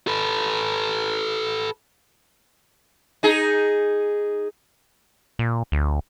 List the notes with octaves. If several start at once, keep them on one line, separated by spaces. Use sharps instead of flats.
A4 B4
D#4 G#4
A#2
D2